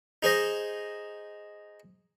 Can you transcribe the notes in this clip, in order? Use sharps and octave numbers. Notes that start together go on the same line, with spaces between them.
D#4 G#4 C5 D#5